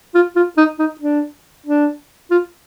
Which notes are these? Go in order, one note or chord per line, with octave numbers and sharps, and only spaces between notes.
F4
F4
D#4
D#4
D4
D4
F4